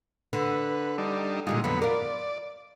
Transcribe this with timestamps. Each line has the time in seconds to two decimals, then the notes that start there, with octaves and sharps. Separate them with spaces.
0.33 D3 B4
0.98 G3 D4 D#4
1.47 A#2 D3 G3 G#3 D#4 F4
1.64 F2 D3 F#3 B3 B5
1.82 F4 A#4 D5